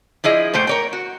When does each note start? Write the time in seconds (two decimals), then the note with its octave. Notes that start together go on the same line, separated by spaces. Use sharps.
0.24 F3 E4 G#4 D#5
0.54 A#2 A3 C5 G5
0.67 A#4 C#5 G5
0.93 F#4